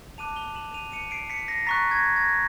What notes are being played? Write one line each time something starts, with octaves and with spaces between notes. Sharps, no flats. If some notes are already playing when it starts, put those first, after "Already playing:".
A5 D6 F#6 D#7 F7
F7 G7
E7 F#7
D#7 F7
C#7 D#7
C7 D7
B6 C#7
A#6 C7
A#5 C#6 F#6 A6 B6
G#6 A#6
G#6 A#6